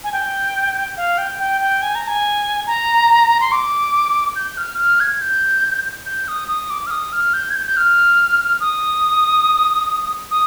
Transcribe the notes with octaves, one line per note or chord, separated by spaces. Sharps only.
G#5
G5
F5
G5
G5
G5
G#5
A#5
G#5
A#5
C6
D6
G6
F6
F6
G#6
G6
G6
D#6
D#6
D6
F6
D#6
F6
G6
G#6
G6
G6
F6
D#6
D#6